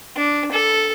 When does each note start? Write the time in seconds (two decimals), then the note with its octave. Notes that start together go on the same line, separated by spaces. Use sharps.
0.16 D4
0.52 A4